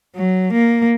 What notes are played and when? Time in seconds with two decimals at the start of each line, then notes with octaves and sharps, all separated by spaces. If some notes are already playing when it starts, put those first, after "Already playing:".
0.15 F#3
0.53 A#3